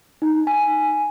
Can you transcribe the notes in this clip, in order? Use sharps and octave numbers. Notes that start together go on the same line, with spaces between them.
D#4
G#5